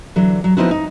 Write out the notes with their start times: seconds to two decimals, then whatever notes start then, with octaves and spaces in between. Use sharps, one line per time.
0.16 D3 E3 F#3
0.44 F#3
0.57 F3 B3 C4 D#4 E4 F#4
0.71 D#4